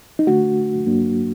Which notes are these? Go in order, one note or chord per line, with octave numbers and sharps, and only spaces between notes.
D#4
D3 A3 D4 F#4
G2 F#3 A#3 D4